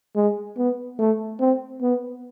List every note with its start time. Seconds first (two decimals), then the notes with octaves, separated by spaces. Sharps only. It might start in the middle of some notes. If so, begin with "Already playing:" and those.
0.15 G#3
0.57 B3
0.99 A3
1.40 C4
1.82 B3